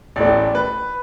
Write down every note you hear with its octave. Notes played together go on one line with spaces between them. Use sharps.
A1 A2 A3 D5
B4